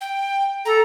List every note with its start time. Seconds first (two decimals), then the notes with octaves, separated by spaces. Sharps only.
0.01 G5
0.65 A4 A#5